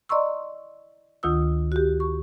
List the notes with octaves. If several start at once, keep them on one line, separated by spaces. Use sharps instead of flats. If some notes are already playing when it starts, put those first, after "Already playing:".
D5 D#5 A#5 C6 C#6 E6
D2 D#3 F4 D#6 E6
F#4 G4
C#6